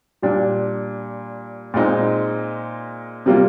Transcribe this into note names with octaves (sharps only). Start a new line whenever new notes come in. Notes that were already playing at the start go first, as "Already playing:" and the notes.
A#2 G3 D4
A#2 G#3 C4 D#4
C3 G3 A#3 F4